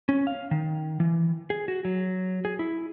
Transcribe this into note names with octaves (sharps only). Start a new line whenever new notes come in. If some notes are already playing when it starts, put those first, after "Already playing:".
C#4
F5
D#3
E3
G#4
F#4
F#3
G#4
E4